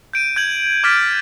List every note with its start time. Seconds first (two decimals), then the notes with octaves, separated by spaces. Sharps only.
0.13 G6 D7 D#7
0.36 G6 G#6 F#7
0.84 D6 F6 G6 A6 B6 D7